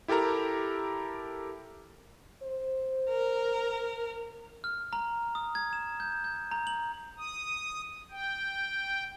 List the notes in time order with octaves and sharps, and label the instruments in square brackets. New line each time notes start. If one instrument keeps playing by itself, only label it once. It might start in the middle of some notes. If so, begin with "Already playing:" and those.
[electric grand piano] E4 G4 A4 A#4 A#5
[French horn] C5
[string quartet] A#4
[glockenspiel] F6
A#5
D#6
G#6
E7
G6
G6
A#5
F#7
[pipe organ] D#6
G5